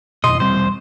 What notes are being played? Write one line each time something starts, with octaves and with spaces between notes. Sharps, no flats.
F2 B2 D#5 C6
E1 G3 C4 C5